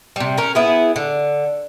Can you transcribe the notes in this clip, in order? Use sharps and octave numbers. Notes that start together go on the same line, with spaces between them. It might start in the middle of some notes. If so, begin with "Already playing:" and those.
C3 G3
C#4 A#4
B3 E4 G#4
D3